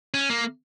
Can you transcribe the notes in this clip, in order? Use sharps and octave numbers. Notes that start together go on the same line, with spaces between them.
C#4
A#3